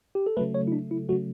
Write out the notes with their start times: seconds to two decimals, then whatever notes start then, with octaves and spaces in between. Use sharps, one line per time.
0.15 G4
0.26 A4
0.37 C#3 F#3 A3 B4
0.54 C#5
0.67 E4
0.72 D4
0.91 E4
1.09 C#3 F#3 A3 F#4